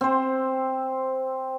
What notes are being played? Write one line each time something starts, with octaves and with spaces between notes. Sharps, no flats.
C4 C5